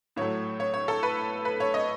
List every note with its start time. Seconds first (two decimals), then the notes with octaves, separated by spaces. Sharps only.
0.16 A2 F#3 A3 C#5
0.60 C#5
0.74 C#5
0.88 A4
1.03 B4
1.45 B4
1.60 C#5
1.74 D#5